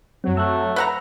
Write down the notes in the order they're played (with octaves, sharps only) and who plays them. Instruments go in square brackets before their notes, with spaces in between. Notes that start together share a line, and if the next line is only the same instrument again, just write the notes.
[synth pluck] F#2 C4 [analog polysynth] F#3
[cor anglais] A3 [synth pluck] E6 F#6
[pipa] B4 F#5 A#5 [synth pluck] B5 E6 A#6